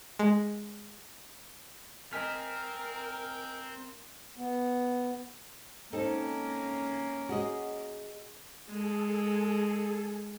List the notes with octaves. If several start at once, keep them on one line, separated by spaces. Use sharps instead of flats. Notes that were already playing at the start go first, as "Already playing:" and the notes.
G#3
C4 A#4 D#5 G#5 F6 B6
B3
A#3 C4 C#4 D#4 A4
F#4 G#4 D#5
G#3 G#4 A4